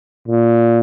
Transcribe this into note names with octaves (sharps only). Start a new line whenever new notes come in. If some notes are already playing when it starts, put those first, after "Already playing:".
A#2